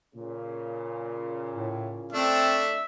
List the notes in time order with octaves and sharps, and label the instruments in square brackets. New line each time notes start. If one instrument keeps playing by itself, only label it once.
[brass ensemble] A#2 C#3
[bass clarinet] A2
[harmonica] A3 D4 [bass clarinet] C4 [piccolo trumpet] E5